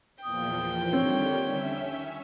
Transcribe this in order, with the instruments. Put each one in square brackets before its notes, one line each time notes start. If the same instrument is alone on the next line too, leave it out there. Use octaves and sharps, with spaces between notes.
[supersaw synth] E2 A#2 F3 [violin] G5 [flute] D#6
[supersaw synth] D3 D#3 G3 [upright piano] C4 [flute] C#5
[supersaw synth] C#4 E5